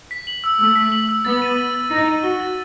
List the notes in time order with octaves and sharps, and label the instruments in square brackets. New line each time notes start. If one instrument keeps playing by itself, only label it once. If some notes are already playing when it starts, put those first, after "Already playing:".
[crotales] B6
F#7
E6
[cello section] A3 [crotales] E6
[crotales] B6
F#7
E6
[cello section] B3 [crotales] A6
[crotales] D#7
G7
A6
[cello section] D#4 [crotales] A6
[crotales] D#7
[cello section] F#4 [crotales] G7
[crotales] A6